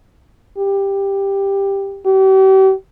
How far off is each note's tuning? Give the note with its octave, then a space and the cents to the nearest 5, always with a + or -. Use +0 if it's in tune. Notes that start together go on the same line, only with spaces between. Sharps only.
G4 +10
G4 -40